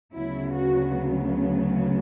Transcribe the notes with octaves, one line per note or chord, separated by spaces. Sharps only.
D2 C#3 F#3 B3 E4
F#4